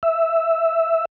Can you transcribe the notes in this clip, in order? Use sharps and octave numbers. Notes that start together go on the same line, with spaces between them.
E5